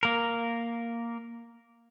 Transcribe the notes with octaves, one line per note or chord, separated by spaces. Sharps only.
A#3 A#4